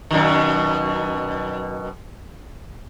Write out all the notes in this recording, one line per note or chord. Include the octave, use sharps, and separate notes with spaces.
F#2 B2 D#3